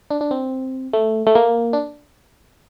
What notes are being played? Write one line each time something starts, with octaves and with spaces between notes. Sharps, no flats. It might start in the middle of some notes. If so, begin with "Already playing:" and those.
D4
D4
C4
A3
A3
A#3
D4